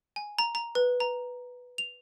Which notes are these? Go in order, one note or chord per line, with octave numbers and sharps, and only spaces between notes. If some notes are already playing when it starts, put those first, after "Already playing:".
G#5
A#5
A#5
B4
A#5
F7